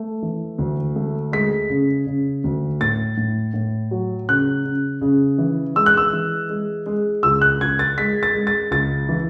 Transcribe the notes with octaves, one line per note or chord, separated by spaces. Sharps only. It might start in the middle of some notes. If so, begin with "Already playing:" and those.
Already playing: A3
E3
D2
A3
G#3 B6
C#3
C#3
D2
A2 A6
A2
A2
F#3
C#3 F#6
C#3
C#3
E3
G#3 E6
F#6
E6
E3
G#3
G#3
C#2 E6
F#6
C#2 G#6
A6
G#3 B6
A6
G#3
A6
C#2 A6
E3